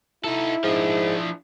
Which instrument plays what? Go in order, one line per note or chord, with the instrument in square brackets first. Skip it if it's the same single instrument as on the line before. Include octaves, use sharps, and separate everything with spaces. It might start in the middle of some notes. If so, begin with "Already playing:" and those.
[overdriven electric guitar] D#4 A4 [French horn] E4
[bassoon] G#2 [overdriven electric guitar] F3 D4